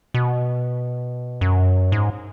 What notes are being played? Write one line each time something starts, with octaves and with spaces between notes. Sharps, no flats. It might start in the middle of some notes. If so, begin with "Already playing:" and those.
B2
F#2
G#2